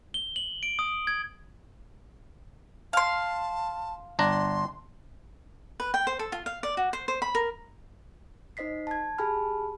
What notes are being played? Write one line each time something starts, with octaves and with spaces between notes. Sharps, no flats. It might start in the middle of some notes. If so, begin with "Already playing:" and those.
G7
F#7
D7
D#6
G#6
F5 A5 C6
G1 D4 A#5 C6
B4
G5
C5
A4
F4
F5
D5
F#4
C5
C5
B5
A#4
D#4 C5 D#5 B6 C7
A5 G#6
G4 G#4 G#5 A5 B5 F6